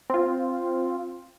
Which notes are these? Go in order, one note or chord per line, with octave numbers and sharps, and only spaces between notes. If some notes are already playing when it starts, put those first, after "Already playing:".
C4 F4